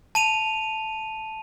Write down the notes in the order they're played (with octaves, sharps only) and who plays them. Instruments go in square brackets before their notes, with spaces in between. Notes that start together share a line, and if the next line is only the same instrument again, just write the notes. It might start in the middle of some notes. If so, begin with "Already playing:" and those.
[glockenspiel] A5 D#7 F7